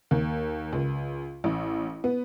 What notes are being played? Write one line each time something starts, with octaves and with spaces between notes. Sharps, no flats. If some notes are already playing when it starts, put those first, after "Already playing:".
D#2
C#2
A1
B3